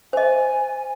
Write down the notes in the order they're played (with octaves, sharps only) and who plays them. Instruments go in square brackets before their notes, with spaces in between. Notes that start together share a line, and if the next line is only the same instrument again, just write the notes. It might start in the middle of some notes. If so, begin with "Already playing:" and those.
[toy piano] C5 D#5 [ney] G#5